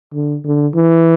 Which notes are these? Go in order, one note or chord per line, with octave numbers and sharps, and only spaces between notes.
D3
D3
E3